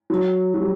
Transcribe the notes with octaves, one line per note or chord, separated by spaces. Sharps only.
F#3
F#3
G3